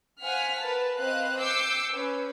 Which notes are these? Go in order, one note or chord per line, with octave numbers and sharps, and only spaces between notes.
C5 F5 F#5 G#5 F6 B6
A#4 B4 A5
C4 B4 C5 D#5 F5 F#6
D6 E6 G6 C7 C#7
C#4 B4 C#5